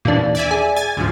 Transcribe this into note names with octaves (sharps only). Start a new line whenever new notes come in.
D#2 A#2 E3 D4
D5 E5 G#5
G#4
G#5 A6
D2 G#2 F3